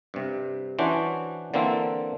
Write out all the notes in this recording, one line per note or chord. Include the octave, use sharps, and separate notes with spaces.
G2 C3
E3 C#4 D4 F#4 C5
D3 E3 A#3 C4 A4